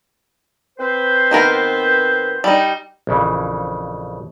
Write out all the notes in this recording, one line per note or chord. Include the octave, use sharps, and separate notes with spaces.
C4 B4 C5
D#3 B3 A#4
G3 D#4
A#1 F2 C#3 E3